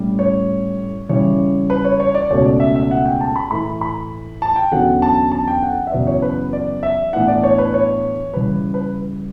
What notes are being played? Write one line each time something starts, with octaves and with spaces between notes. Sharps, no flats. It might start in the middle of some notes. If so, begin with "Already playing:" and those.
Already playing: A2 G3 C#4
C#5
C#3 E3 G3 C#4 C#5
B4
C#5
C#5
D5
C#2 B2 A3 C#4 C#5
D5
E5
E5
F#5
G5
A5
B5
A2 E3 A3 B5
B5
A5
G5
E2 D3 F#3 C#4 F#5
A5
A5
G5
F#5
E5
F#2 C#3 E3 B3 D5
C#5
B4
D5
E5
A2 E3 B3 D4 F#5
D5
C#5
B4
C#5
C#3 E3 G3 B4
B4